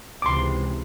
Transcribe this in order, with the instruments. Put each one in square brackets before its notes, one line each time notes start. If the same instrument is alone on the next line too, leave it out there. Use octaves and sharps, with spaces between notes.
[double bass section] C#2 C3 E3 [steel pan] C6 D6